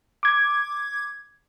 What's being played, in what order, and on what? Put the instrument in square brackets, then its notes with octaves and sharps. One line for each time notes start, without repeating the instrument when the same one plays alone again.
[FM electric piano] D6 G#6